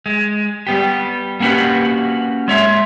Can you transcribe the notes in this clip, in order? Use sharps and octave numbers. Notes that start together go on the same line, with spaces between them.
G#3
G3 B3 G4
A#3 C#4 F#4 G4 B4
G#3 C#5 E5